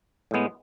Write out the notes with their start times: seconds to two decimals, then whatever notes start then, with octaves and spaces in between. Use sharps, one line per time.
0.31 A2 G#3 B3